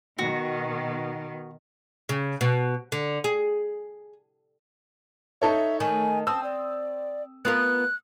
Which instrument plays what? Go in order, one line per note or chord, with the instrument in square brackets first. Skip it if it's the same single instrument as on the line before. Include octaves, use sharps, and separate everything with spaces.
[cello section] B2 D#3 [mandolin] F#4
[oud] C#3
B2
D3
G#4
[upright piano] D#4 A4 C#5 [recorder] E5
[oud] D#3 A3 [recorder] G#5
[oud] C4 [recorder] A5 [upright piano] D#6 E6
[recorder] D5
[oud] B3 F4 A#4 [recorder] F#6